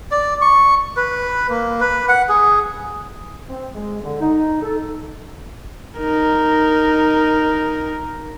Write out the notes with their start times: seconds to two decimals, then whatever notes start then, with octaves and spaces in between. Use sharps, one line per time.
0.11 D5
0.41 C#6
0.97 B4
1.50 A#3
1.81 B4
2.09 F#5
2.29 G#4
3.48 C4
3.75 G#3
4.03 D3
4.21 D#4
4.63 A4
5.98 D#4 A#4